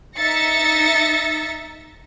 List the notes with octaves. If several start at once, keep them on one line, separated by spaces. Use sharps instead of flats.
D#4 E5 A6 A#6 C#7